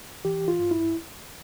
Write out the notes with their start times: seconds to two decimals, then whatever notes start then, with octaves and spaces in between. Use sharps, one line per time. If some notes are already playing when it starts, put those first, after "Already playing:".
0.25 E3 G4
0.48 F4
0.59 G2
0.71 E4